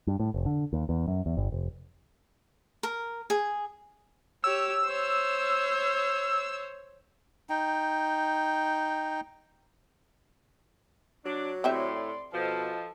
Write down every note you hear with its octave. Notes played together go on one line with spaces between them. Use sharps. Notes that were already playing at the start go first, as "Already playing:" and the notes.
G2
A2
F1
D3
D#2
E2
F#2
E2
G1
F1
A#4
G#4
G4 C#5 E6
C5 C#5
D#4 G5
F#3 D4
A2 C4 G4 D5 E5 C6
B2 F3 A4 D#5